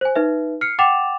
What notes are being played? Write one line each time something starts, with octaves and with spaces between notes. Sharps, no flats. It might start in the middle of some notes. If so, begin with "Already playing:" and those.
C5 G#5
D#4 B4 E5
F6 C7 C#7
F#5 G5 D6 A6 E7 F7